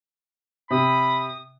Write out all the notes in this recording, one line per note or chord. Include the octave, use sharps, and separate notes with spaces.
C3 B5 D#6